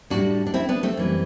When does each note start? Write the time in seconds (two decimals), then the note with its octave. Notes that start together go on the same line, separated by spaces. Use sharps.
0.10 A2 G3 D4 F#4
0.47 D4
0.54 C4 E4
0.69 B3 D4
0.83 A3 C4
0.97 F#2 E3 G3